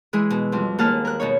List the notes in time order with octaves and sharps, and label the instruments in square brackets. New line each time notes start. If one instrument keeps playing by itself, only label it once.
[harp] E3 G#3 E4 G#4
B2
F2 G3 C4
D#2 A#3 G#4 F#5 A5 F6
A#4 F#6
B2 B3 D#4 C#5